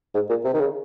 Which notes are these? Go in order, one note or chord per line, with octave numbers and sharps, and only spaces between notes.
G#2
A#2
C3
D#3
C#3